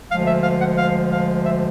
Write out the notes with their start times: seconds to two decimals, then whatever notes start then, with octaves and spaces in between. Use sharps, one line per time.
0.11 D2 D3 F3 G#3 F5
0.26 E5
0.43 F5
0.60 F#5
0.77 F5
1.11 F5
1.45 E5